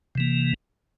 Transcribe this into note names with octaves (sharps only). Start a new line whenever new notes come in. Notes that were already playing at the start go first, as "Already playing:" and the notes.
C3 E3 A#3